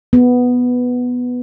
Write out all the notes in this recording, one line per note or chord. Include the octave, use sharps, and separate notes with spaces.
B3